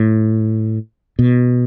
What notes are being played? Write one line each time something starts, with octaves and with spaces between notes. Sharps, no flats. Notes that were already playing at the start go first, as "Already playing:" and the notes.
Already playing: A2
B2